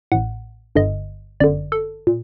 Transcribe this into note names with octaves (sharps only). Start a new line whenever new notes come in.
A1 A2 F#5
G1 G2 D3 D#5
G1 F#2 D3 D5
A4
A#2